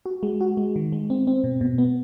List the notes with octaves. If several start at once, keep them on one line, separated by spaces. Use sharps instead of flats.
F#4
G#3
F#4
G#3
D#3
G#3
C4
C4
B2
B2
B3